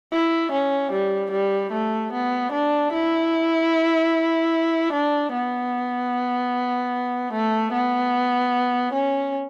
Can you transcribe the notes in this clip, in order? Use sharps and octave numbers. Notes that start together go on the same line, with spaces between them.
E4
C#4
G3
G3
A3
B3
D4
E4
D4
B3
A3
B3
C#4